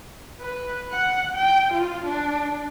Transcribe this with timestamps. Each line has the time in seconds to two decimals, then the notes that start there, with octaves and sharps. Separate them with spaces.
0.41 B4
0.92 F#5
1.35 G5
1.74 F4
2.06 D4